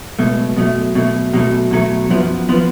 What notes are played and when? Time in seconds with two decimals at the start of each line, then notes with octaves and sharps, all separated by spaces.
0.19 C#2 B2 F#3 A3
0.57 B2 F#3 A3
0.95 B2 F#3 A3
1.34 B2 F#3 A3
1.71 B2 F#3 A3
2.10 F#2 F3 B3
2.49 F3 B3